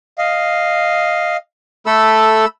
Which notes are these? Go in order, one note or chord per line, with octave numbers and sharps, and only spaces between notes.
D#5 F5
A3 A4 B5 E6